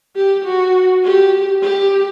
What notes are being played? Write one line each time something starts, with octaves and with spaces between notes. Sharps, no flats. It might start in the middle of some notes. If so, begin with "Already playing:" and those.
G4
F#4
G4
G4